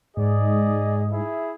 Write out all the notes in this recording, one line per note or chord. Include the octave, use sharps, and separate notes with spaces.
G#2 G#4 D5 D#5
E4 G#4 E5